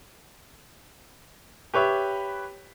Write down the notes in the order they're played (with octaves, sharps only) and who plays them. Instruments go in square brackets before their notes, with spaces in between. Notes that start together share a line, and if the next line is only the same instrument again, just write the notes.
[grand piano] G4 B4 C#5 E5